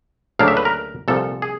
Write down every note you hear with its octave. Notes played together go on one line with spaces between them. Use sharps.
D2 C#3 F#3 A#3 D4 F5
E5
B4
A#4
C2 A#2 F3 A4
G#4